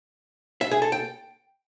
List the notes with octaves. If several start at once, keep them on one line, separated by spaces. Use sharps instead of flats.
E5
G#4
A4
G5